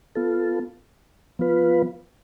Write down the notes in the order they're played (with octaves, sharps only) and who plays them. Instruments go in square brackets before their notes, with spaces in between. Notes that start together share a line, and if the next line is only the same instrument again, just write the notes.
[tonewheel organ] B3 F4 A4
F3 B3 F4 B4